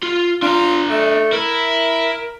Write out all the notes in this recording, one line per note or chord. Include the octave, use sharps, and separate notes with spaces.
F4
D4 F4 A#5
A3
E4 A#4